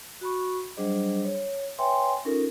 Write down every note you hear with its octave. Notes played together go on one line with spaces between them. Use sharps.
F#4 B5 C#6
F#3 G3 D4 G#4 C5 D#5
C#5
B4 C#5 E5 G5 G#5 C6
C#4 D#4 F4 A4 A#4